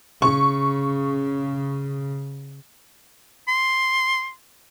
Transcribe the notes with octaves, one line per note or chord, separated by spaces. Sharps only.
C#3 C#6
C6